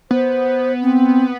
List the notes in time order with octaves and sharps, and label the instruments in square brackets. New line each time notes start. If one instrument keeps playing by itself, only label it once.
[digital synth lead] B3 [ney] C5
[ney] C4